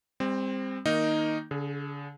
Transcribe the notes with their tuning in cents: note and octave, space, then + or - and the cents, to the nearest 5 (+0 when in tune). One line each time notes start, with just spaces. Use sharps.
G3 +40 C4 +0
D#3 +10 A#3 +0 D#4 +0
D3 -40 G#4 +0